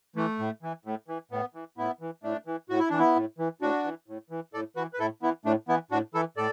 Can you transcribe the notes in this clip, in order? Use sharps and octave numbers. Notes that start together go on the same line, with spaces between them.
E3 A3
A2
E3
A2
E3
A2 B3
E3
A2 B3 E4
E3
A2 A3 D4
E3
A2 F#4
E4
E3 D4
B3 E4
A2
E3
A2 D4 F#4
E3
A2
E3
A2 A4 D5
E3 F#4 B4
B4
A2 E4 A4
E3 B3 E4
A2 A3 D4
E3 B3 E4
A2 D4 F#4
E3 E4 A4
A2 A4 D5